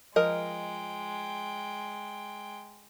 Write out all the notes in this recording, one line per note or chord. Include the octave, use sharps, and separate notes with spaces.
F3 G#3 A#4 D#5 G5